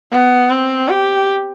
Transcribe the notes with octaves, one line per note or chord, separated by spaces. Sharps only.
B3
C4
G4